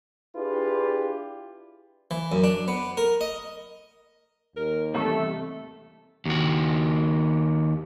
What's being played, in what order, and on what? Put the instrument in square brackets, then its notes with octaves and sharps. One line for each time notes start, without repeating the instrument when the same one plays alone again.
[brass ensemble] D4 E4 F4 G4 G#4 B4
[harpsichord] E3
F#2
D4
B3
A#4
D#5
[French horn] D#2 [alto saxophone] A#4
[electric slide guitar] E2 G2 C3 [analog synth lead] A3 [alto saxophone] A4
[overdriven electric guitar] D#2 F#4